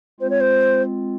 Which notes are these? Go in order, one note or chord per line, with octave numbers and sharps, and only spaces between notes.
G#3 C4 F4 C5
C#5
C5